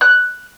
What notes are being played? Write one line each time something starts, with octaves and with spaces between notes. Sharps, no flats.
F#6